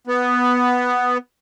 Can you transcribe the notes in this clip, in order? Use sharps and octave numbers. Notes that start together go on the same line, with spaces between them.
B3